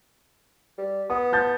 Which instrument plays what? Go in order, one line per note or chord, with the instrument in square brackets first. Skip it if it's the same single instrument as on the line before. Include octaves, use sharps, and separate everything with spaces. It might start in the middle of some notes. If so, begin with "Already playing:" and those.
[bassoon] G3
[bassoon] B3 [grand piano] D#6
[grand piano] A5 G6 A6